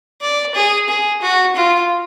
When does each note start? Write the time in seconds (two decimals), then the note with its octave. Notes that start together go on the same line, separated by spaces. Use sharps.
0.21 D5
0.55 G#4
0.89 G#4
1.22 F#4
1.56 F4